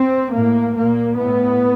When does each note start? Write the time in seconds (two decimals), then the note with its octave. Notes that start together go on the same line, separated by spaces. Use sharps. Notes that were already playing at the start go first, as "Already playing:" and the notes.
Already playing: C4
0.32 A2 A#3
0.75 A#2 A#3
1.17 A2 B3